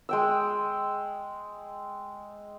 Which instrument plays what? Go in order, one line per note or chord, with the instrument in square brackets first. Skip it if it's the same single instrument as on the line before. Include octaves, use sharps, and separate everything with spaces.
[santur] G#3 G5 E6